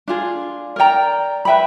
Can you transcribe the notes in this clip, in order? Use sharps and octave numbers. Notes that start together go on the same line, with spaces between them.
D4 F4 G#4
A#4 D5 G5 A#5
B4 E5 G5 B5